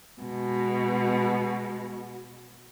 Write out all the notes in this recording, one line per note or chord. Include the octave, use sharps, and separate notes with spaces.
B2 G#3